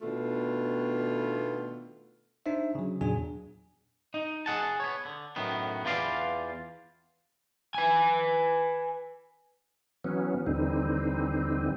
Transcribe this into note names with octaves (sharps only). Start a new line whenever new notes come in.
B2 D#3 A3 B3 D4 F4
D4 D#4 C5 E5
C#3 F#3
E2 A#2 F#3 D4 G#4 G#5
D#4
G#4 F#5 A5
B3 C#5
D3
F#2 A2 D#3 B3
E2 F4 B4 D5 F5
B4 G#5
E3 F#3 B3 C#4
D#2 D3 E3 G3 C4 D#4